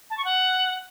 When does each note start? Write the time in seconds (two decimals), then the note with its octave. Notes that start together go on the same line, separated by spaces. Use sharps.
0.10 A5
0.18 C#6
0.25 F#5